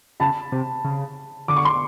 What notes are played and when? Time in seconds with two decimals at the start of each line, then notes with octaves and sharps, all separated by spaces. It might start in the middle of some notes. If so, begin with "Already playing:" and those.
0.20 C#3 A5 B5
0.52 C3
0.84 C#3
1.48 D3 D6
1.56 C#6
1.65 C6